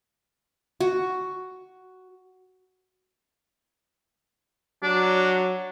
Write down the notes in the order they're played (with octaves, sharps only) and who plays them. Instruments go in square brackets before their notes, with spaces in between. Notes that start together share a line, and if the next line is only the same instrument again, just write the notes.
[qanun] F#4
[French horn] F#3 [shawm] D4